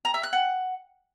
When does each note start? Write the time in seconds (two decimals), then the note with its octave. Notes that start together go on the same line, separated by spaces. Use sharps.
0.05 A#5
0.14 E5
0.23 F#6
0.33 F#5